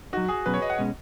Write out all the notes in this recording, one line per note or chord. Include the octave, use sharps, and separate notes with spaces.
F#3 D#4 F#4
G#4
B2 F#3 C#4 B4
C#5
D#5
F#5
B2 G#3 C#4